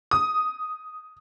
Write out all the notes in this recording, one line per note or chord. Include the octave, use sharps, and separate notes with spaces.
D#6